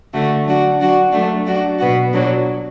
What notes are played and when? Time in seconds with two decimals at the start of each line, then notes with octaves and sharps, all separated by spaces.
0.13 D3 A3 F#4
0.46 F#3 D4 F#4
0.79 F#3 D4 F#4
1.12 F#3 A3 D4
1.45 F#3 D4 F#4
1.78 B2 B3 F#4
2.11 B2 F#3 D4 F#4